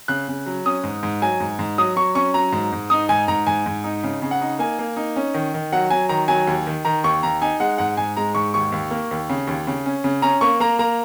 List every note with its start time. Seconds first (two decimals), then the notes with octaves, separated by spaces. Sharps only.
0.08 C#3 F#6
0.28 C#3
0.46 F#3
0.66 C#4 D#6
0.84 G#2
1.03 G#2
1.21 F#3 G#5
1.40 G#2
1.59 G#2
1.78 F#3 D#6
1.96 F#3 C#6
2.15 C#4 C#6
2.34 F#3 A#5
2.52 G#2
2.72 G#2
2.90 D#4 D#6
3.09 G#2 G#5
3.28 G#2 A#5
3.47 G#2 G#5
3.66 G#2
3.84 D#4
4.03 C#3
4.22 C#3
4.31 F#5
4.41 D#4
4.59 A#3 G#5
4.79 A#3
4.97 D#4
5.16 C#4
5.34 D#3
5.54 D#3
5.72 F#3 F#5
5.90 F#3 G#5
6.09 D#3 A#5
6.28 F#3 G#5
6.47 D#2
6.67 D#3
6.85 D#3 A#5
7.04 D#2 C#6
7.23 D#2 A#5
7.42 D#4 G#5
7.60 G#3 F#5
7.78 G#2 F#5
7.97 G#2 G#5
8.17 G#3 A#5
8.35 G#2 C#6
8.54 D#2 C#6
8.72 D#2
8.91 A#3
9.11 D#2
9.30 C#3
9.47 D#2
9.67 C#3
9.86 C#4
10.04 C#3
10.22 C#4 A#5
10.41 A#3 C#6
10.60 A#3 A#5
10.79 A#3 A#5